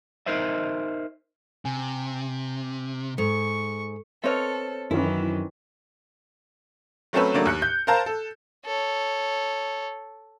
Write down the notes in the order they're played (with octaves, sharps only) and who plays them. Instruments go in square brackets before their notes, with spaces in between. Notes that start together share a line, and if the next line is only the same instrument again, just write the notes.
[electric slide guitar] D#4 A#4 C5 D#5 E5
[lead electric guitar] C3 [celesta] G#5
[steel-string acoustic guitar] G#2 [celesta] A4 [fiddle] C#6
[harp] C4 C#5 F6 [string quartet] A4 [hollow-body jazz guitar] B4 D#5 E5
[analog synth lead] F#2 [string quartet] D#3 E3 [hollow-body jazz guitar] E4
[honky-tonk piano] F#3 A3 C4 C#4 A4 B4
C#3 F#3 A3 A#3 D4
D#2 F#6 C#7
G6
A#4 C5 F5 A5 A#5
A4
[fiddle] A4 C#5